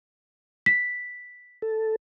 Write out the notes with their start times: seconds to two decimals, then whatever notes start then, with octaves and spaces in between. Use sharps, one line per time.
0.66 B6
1.62 A4